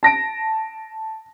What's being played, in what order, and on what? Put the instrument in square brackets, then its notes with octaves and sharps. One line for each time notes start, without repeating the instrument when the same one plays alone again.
[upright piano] A5 A#6 D7